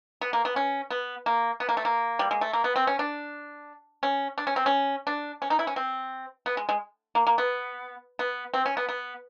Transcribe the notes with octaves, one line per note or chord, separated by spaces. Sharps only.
B3
A#3
B3
C#4
B3
A#3
B3
A#3
A3
A#3
G3
G#3
A3
A#3
B3
C4
C#4
D4
C#4
D4
C#4
C4
C#4
D4
C#4
D#4
E4
C#4
C4
B3
G#3
G#3
A#3
A#3
B3
B3
C4
C#4
B3
B3